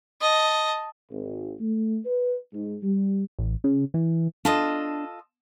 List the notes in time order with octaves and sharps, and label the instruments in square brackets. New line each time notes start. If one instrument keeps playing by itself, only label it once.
[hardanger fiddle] D#5 A5
[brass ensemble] G#1
A3
B4
G#2
G3
[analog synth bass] A1
C#3
E3
[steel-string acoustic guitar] D4 A5 [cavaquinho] F4 A4 D#5